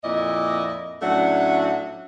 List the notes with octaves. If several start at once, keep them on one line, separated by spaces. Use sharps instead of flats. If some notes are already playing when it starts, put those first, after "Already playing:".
F2 A#2 E4 D5 D#5
A2 F#3 A3 C#4 D4 F#5